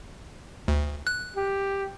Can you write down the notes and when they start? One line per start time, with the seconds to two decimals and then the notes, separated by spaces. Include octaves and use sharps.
0.68 D2
1.07 F#6
1.36 G4